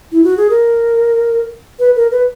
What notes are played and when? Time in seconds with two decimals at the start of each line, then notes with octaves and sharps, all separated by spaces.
0.12 E4
0.24 F#4
0.37 G#4
0.50 A#4
1.79 B4
1.96 A#4
2.11 B4